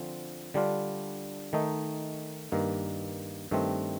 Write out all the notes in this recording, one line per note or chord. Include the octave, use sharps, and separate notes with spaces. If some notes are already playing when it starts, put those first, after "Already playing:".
Already playing: D3 F3 C4
D3 G3 D4 F4
D#3 A3 D#4
G2 D#3 A#3
G2 D#3 A3 C4